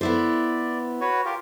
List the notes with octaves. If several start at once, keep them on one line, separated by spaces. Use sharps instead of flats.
B3 E4 C5 D5
F#4 B4 C#5
F4 G4 A#4